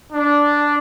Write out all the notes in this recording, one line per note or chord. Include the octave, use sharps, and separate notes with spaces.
D4